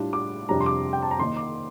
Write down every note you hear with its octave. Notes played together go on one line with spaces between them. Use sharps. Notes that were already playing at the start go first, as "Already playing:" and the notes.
Already playing: A2 G3 D4 F4
D6
F2 C3 G3 D4 A#5
C6
D6
G5
A5
A#5
D#3 A#3 D#4 C6
D6